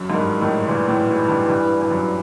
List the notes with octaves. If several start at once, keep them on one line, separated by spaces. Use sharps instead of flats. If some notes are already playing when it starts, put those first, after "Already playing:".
Already playing: F#2
G#2
G2 D#3
A2 D#3
A#2 E3
A2
G#2
G2
G2
G2
F#2